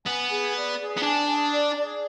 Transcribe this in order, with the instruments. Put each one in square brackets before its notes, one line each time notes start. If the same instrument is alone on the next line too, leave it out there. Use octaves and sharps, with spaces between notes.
[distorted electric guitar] B3 [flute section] G#5
[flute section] G#4
D5
G#4
[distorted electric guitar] B3
[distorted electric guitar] D4 [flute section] G#5
[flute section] G#4
D5
G#4